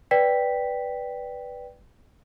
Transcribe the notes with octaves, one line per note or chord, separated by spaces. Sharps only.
B4 D5 G5 B6